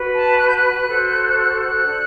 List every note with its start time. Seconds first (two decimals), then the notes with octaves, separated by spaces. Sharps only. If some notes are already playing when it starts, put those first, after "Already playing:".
Already playing: F#4 B4
0.14 A5
0.38 F#6
0.48 G6
0.56 F#6
0.87 F#4 A4 C5
1.37 F#6
1.60 F#6
1.84 D4 A4 C5